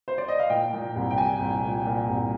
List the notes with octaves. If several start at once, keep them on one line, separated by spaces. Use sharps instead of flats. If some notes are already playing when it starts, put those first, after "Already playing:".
C5
D5
D#5
F5
A#2 G5
A#2
C2
G5
A#2 G#5
C2
A#2
A#2
C2